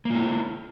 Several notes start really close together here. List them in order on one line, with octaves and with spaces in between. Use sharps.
A#3 F4 E4